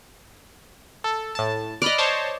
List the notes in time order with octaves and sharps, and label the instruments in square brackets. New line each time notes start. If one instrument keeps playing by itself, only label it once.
[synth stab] A4
A2 A5
[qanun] D5 D#5 [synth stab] B5 F6 F#6
[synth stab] C5 C#5 A5